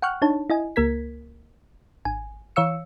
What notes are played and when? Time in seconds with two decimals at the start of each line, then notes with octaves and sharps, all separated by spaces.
0.02 F#5 G5 C#6 F6 F#6
0.22 D4 D#4 C#5 A5
0.50 E4 D#5 G#5
0.76 C#2 A#3 A#4 G#6 B6
2.05 G#1 G#5
2.56 E3 C#5 F5 E6 C#7